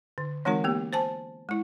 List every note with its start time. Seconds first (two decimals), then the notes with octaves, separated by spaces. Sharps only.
0.18 D3
0.45 E3 G#3 C4 D#4 F#4 A#4
0.64 A#3 B3 G4
0.93 C5 G#5 A5
1.49 G#3 E4